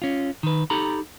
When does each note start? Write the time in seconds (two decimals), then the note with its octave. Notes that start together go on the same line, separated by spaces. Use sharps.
0.02 C#4 F4
0.43 D#3 B4
0.70 D#4 G4 A4 A#5 B5